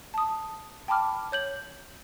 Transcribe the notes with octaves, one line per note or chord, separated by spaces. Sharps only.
A5 D#6
G5 A5 B5 D6 F6
C#5 G6 F#7